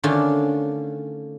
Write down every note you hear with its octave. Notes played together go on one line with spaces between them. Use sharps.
D3 D#3 A3 C#4 D4 F4